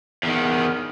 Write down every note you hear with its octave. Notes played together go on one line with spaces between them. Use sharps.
E2 D#3